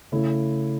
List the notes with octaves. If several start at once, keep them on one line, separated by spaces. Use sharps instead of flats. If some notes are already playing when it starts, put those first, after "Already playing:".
C#3 A3 E4